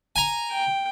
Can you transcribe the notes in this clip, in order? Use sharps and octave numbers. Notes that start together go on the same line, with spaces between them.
G#5 A#5
G5